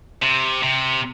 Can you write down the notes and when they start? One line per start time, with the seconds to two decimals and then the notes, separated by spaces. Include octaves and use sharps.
0.22 C3
0.63 C3